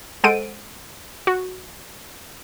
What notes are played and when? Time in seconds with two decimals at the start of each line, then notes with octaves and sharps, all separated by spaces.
0.24 G#3 A4 C5 F#5 D7 D#7
1.27 F#4